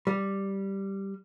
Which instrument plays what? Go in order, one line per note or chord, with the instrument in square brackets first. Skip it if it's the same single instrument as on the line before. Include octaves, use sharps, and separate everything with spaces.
[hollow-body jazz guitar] G3